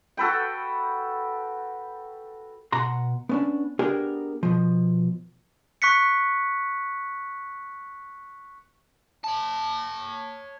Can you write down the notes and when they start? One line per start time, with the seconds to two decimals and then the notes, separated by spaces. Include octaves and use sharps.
0.17 F#4 A4 B4 G5
2.72 B2 F#5 A#5 C6
3.29 B3 C#4 D4
3.79 B3 D4 G4 G#4 A#4
4.43 B2 F3
5.82 C#6 F#6 B6 C#7
9.24 C#5 A5